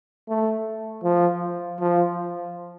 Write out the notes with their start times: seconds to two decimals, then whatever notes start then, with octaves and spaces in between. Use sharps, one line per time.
0.29 A3
1.04 F3
1.80 F3